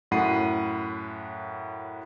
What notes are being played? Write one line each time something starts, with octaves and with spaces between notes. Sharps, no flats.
F#2 A2 F#5 B5 C7 D#7